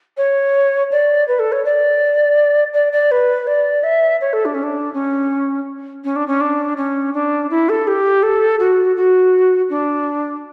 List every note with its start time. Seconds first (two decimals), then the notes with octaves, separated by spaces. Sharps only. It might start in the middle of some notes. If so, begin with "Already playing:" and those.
0.17 C#5
0.92 D5
1.28 B4
1.39 A4
1.52 C#5
1.65 D5
2.74 D5
2.93 D5
3.11 B4
3.47 D5
3.83 E5
4.21 C#5
4.33 A4
4.45 D4
4.54 C#4
4.63 D4
4.94 C#4
6.04 C#4
6.16 D4
6.28 C#4
6.41 D4
6.77 C#4
7.14 D4
7.51 E4
7.69 A4
7.87 G4
8.23 A4
8.59 F#4
8.96 F#4
9.70 D4